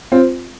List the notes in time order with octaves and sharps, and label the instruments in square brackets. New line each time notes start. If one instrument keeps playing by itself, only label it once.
[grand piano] C4 F4